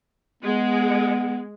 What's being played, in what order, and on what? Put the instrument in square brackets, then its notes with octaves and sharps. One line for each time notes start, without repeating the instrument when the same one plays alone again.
[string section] G#3 [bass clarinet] B3